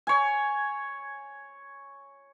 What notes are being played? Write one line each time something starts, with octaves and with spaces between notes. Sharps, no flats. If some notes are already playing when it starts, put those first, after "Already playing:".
C#5 G#5